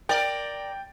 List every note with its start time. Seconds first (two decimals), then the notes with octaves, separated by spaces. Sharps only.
0.09 A#4 D5 G5 A6